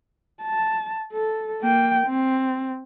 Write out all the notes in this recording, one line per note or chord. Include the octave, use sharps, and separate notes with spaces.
A5
A4
A#3 G5
C4